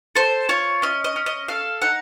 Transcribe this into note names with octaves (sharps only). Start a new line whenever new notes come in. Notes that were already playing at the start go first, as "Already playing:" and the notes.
A4 C5
F4 C#5
C#4 D#5
D#5
C#4
D#5
A4 F5
D#4 F#5